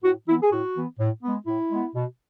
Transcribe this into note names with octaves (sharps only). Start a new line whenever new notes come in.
A2 F#4
E3 B3 E4
G#4
A2 F#4
E3 B3
A2
G#3 B3
A2 E4
G#3 B3
B2